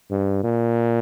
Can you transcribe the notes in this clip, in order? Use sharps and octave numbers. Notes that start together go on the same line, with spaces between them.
G2
A#2